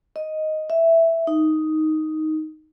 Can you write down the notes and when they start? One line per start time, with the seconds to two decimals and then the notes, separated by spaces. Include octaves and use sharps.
0.16 D#5
0.70 E5
1.27 D#4